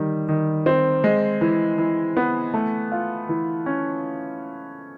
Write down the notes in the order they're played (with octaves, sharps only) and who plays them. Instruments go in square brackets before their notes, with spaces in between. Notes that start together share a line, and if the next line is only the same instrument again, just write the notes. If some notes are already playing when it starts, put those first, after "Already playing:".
Already playing: [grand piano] D#3 G3
D#3
C4
G#3
E3
E3
B3
A3
F4
E3
C#4